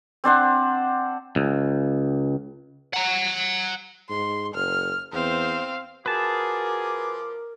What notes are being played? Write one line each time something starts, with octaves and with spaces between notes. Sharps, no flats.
C4 D4 C5 F#5
C#2
F#5 A#5
G#2 C6
F#1 F6
E2 C4 C5 F5
F3 F#4 G#4 A#4 B4 A5 D6